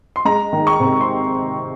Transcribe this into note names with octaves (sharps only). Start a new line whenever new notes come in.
C6
G#3 A#5
D#3
C#6
C3
C6